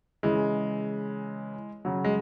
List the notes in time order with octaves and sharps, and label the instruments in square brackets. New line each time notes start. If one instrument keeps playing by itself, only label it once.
[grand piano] C#3 E3 G#3
C#3 F#3
G#3